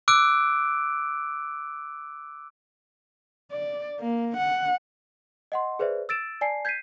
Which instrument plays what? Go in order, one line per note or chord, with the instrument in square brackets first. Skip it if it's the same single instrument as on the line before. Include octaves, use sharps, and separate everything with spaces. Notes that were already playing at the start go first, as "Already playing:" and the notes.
[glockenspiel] D6 E6 F#6 D7
[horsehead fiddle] D5
A#3
F#5
[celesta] D#5 F#5 C6
G#4 B4 C5 D5 E5
E6 A6 D7 E7
D5 G#5 A5 C7
G6 G#6 B6 C7 D#7